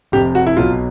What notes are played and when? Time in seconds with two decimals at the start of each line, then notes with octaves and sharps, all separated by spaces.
0.12 F1 F2 C3 G4
0.35 F#4
0.46 E4
0.57 B1 B2 F#3 F4